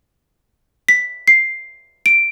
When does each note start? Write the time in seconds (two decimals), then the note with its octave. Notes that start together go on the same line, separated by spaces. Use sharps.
0.89 B6
1.28 C7
2.06 D7